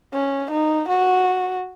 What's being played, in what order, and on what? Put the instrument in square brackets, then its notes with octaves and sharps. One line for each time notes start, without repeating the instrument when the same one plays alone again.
[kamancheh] C#4
D#4
F#4